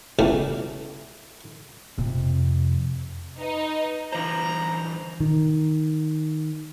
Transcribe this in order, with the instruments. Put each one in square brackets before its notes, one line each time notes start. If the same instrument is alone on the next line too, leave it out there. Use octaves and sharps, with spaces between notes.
[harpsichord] C#2 B2 E3 G3 A3
[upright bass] F2 C3
[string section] D#4 [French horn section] B4
[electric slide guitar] D3 E3 C5 [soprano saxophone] A#5
[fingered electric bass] D#3